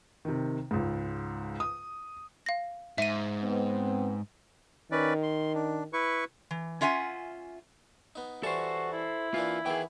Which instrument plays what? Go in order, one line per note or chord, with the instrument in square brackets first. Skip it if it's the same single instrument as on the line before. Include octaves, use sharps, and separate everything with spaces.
[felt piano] C3 D#3
C#2 G#2
D#6
[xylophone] F5 A#6
[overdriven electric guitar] G#2 [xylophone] E5 D#7
[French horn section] B3 C4
[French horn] D#3 [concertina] C#4 B4 D5
[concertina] C6
D4
E4 B4 C#6
[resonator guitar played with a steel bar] E3
C#4 F4 E5 F#5 G#5
[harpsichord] B3 D#4
[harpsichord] E3 G3 C#6 [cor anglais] F#4 [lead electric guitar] A4 C5
[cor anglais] E4
[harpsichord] E3 A#3 D4 [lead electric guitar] F4
[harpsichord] D#3 E3 B3 [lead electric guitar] G#4 G5